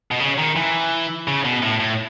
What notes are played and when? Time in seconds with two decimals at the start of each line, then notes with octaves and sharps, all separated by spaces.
0.11 B2
0.20 C#3
0.38 D#3
0.56 E3
1.28 C#3
1.45 B2
1.62 A2
1.80 A2